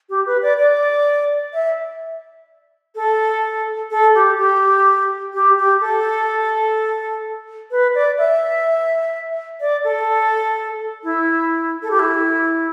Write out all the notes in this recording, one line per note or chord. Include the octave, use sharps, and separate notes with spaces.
G4
B4
D5
D5
E5
A4
A4
G4
G4
G4
G4
A4
B4
D5
E5
D5
A4
E4
A4
G4
E4